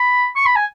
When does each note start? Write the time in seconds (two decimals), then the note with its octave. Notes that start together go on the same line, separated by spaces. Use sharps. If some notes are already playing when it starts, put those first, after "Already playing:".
Already playing: B5
0.36 C#6
0.46 B5
0.56 G#5